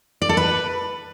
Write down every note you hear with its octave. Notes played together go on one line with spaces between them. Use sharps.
D5
A4
B4